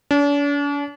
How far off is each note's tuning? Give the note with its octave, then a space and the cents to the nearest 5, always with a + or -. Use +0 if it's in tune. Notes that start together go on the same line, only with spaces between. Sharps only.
D4 -45